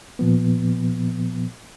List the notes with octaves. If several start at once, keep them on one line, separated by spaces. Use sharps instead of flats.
A#2 F3 B3